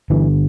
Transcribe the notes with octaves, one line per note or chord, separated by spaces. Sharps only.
G1 G2 D3 E3